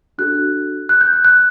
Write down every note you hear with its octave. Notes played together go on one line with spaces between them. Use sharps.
D4 F#4 A4 F#6
F#6
G6
F#6
F#6